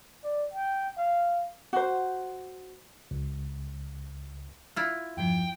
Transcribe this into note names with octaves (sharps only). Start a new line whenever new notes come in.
D5
G5
F5
F#4 C5
C#2
E4 F4
E2 G2 F3 G5